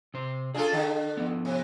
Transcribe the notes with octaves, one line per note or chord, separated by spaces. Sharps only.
C3 C5
D4 F4 G#4 A4 F5 G#5
D3
F3 B3
C3